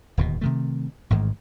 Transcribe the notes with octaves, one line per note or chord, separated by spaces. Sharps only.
D1 D#2 B2
C3 D#3 A3
A1 G#2 D#3 G#3